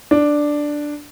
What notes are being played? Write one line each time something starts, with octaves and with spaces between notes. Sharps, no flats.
D4